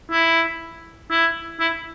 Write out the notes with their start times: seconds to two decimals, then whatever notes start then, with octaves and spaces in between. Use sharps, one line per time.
0.11 E4
1.11 E4
1.60 E4